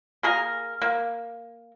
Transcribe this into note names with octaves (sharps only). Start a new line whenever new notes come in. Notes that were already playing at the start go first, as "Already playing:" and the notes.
A#3 G#4 A#4
A#3